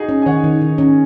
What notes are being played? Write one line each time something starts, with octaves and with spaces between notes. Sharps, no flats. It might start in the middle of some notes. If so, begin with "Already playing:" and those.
Already playing: D#4 F#4 G#4
C#4
G#5
D#3 C#5 F#5
D#3
D#3
C#4